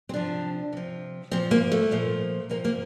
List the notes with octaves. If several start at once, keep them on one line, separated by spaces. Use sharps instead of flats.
C4
C3 F3 D4
C3 F3
A#2 F3 C4
A#3
A3
A#2 F3
C3 F3 A#3
A#3